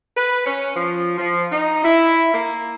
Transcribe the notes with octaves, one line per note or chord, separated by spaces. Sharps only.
B4
C#4
F3
F3
D#4
E4
A#3